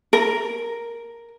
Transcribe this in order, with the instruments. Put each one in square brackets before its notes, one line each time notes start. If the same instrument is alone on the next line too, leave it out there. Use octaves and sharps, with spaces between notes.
[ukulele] A#4